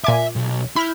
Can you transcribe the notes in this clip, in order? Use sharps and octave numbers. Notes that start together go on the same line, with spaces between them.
A#2 E5 G#5 D6
B1
E4 B5 F6 G6